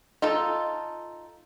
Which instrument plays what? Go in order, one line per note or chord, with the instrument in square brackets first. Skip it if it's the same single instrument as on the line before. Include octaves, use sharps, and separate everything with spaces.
[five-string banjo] D#4 F4 A4